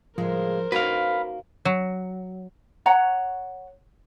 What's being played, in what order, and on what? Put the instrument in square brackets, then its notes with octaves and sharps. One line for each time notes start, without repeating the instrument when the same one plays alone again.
[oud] A2 C#3 G#3 [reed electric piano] F3 [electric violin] A#4 C5
[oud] A#3 C#4 D#4 [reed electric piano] F#4 [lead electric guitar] B4 F5
[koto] F#3
[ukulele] C#5 F#5 A#5